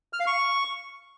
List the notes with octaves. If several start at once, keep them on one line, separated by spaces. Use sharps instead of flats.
F6
F5
C#6